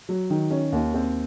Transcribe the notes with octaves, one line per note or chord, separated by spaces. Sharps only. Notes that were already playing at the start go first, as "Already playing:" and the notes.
F#3
D#3
C#4
D#2
C4